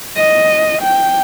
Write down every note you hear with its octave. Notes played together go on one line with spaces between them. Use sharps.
D#5
G5